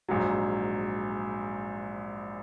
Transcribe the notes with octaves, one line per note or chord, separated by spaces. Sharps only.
A#1 G#2 F#3